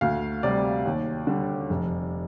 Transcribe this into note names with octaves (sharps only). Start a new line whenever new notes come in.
D2 F5
C3 G3 D5
D#2
D3 G3
F1